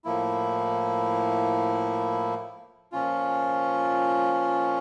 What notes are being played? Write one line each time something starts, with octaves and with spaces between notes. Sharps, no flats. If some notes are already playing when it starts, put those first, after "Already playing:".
A2 F3 A#3 E4
A#2 F3 C#4 F4